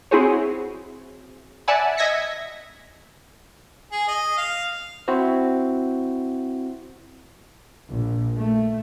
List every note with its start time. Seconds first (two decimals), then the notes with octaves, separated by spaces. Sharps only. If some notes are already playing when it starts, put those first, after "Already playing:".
0.11 C4 E4 F#4 G#4 C5 C#5
1.68 D5 E5 F#5 G#5 A5 B5
1.97 D#5 E5 G#6 A#6 B6 C#7
3.92 G#4
4.08 D#5
4.37 F5
5.08 C4 E4 F#4 C5
7.89 A#1
8.37 A3